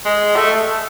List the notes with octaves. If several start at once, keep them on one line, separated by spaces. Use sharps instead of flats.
G#3
A3